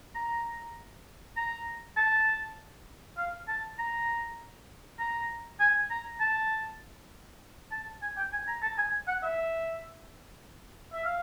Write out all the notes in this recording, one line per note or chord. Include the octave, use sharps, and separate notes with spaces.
A#5
A#5
A5
F5
A5
A#5
A#5
G#5
A#5
A5
A5
G#5
G5
G#5
A#5
A5
G#5
F#5
E5
E5
F5